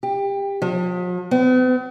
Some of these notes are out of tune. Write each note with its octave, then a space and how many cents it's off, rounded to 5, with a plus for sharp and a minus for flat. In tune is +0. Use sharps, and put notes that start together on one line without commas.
G4 +20
F3 +45
B3 +45